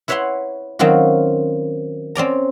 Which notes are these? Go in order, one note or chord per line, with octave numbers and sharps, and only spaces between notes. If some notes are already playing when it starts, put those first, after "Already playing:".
E4 B4 C#5 E5 F#5 C6
D#3 F#3 C4 C#4 F4 F#4
C4 C#4 D5 A#5